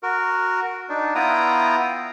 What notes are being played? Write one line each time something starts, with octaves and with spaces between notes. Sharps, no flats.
F#4 A#4
D4 D#4
B3 E4 F4 G5 A#5 D#6